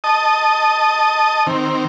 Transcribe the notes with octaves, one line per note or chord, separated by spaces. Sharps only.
D#5 A5 D#6
D#3 C4